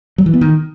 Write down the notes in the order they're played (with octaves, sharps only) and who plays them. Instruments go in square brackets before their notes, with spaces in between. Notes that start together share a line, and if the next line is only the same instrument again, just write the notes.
[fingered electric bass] F#3
E3
B3
D#3